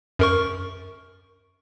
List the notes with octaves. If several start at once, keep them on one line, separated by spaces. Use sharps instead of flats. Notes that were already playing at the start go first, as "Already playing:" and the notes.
F#2 A#4 C#6